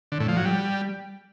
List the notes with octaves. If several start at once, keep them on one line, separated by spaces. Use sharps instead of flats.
D3
A2
F3
F#3
G3